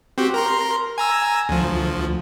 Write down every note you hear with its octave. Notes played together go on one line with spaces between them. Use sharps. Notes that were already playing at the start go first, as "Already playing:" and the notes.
C4 F#4 G4
A#4 A#5 C6
G#5 A#5 E6
D2 F3